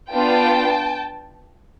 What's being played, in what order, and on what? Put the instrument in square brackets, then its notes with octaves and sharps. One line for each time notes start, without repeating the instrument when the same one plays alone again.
[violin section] B3 D4 F4 G5 A5